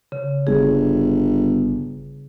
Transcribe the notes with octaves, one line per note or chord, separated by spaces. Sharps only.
C#3
G1 G#4